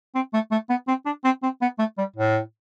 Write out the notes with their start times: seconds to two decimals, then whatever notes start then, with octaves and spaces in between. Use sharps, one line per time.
0.15 C4
0.33 A3
0.51 A3
0.69 B3
0.88 C4
1.06 D4
1.24 C4
1.43 C4
1.61 B3
1.79 A3
1.98 G3
2.16 A2